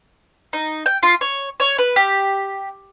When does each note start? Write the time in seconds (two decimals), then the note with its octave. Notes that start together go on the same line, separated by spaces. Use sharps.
0.53 D#4
0.86 G5
1.03 F4
1.21 C#5
1.60 C#5
1.78 B4
1.96 G4